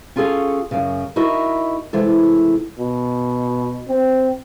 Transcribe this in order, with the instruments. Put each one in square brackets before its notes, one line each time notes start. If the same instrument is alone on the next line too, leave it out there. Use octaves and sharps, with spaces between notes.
[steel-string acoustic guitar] C#4 F4 F#4 G#4 A4 F5
F#2 C#3
D#4 E4 F#4 A#4 D#5 E5
C3 E3 G#3 A4
[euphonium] B2
C4